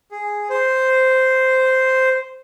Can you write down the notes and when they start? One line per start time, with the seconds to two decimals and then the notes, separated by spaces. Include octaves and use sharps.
0.11 G#4
0.50 C5